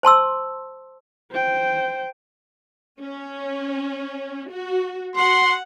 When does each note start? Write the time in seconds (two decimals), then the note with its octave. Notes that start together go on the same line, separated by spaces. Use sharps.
0.03 C5 A5 C6 E6
1.32 C5 G5
3.01 C#4
4.51 F#4
5.16 F#4 F#5 C6